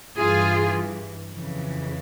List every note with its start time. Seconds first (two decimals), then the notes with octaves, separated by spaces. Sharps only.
0.17 G2 E3 F4 G#4
1.31 F2 C#3 E3